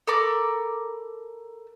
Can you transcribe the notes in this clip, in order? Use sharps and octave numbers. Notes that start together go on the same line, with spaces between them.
A4 A#4 B5 D6